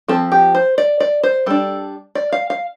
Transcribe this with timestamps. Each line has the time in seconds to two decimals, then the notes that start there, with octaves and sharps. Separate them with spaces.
0.08 F3 C4 A4
0.32 G4
0.55 C5
0.78 D5
1.00 D5
1.23 C5
1.46 G3 D4 A4
2.15 D5
2.32 F5
2.50 F5